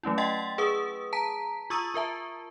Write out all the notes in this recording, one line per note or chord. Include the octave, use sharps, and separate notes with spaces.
F#3 A3 C#4 E4
D#5 F#5 G5 C6 A6
G#4 B4 F#5 D#6
A5 A#5 B6
F4 C#6 D#6 E6 A6 D#7
F4 A#4 E5 A5